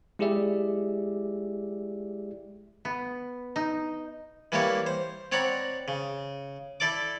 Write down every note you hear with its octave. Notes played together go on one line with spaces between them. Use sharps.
G#3 E4 G4 G#4 D5 E5
B3
D#4
E3 G3 A#3 E4 C#5
C5
C4 C#5 D5 F#5 A#5 B5
C#3
E4 A4 D5 D6